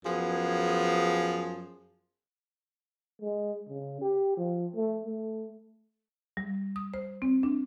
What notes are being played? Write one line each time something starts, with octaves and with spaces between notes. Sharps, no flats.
F#2 F3 B3 G#4
G#3
C#3
G4
F3
A3
A3
G3
D#6
C5
C4
D4